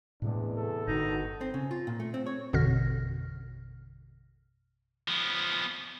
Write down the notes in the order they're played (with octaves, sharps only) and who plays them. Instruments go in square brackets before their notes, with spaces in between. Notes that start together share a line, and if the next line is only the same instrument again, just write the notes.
[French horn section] E2 [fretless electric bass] A2 C3 G#3 [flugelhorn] D4
[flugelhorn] A4
[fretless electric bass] G1 D3 [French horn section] D#3 B3 F#4 [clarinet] D#4
[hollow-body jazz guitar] C4
C#3
F4
A#2
A3
C4
C#5
[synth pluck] A1 F2 B2 D3 F6 A#6
[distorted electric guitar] F3 B3